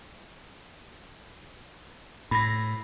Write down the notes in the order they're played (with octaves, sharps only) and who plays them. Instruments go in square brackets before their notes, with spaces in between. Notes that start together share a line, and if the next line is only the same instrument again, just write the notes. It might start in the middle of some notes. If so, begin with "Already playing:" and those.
[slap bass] A2 [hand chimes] B5 A#6